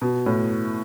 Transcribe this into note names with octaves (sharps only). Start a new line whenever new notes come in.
B2
A2